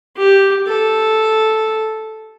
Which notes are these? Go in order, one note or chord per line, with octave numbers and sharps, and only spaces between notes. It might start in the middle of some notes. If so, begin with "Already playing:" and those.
G4
A4